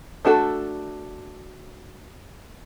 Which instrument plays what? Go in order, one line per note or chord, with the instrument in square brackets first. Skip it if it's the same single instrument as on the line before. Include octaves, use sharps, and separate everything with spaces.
[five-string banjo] A3 D4 F#4 G#4 A4